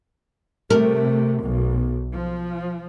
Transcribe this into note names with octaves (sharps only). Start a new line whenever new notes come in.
C3 A3 A#4
B1
F3